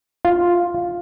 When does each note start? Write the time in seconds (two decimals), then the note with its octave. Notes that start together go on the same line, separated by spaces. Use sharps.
0.25 F4